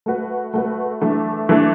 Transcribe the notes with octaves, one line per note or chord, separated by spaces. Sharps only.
A3 F#4 B4
A3 F#4 B4
E3 A3 D4
E3 A3 D4